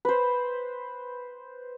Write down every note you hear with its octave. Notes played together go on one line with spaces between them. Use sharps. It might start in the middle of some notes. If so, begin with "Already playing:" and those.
B4 C5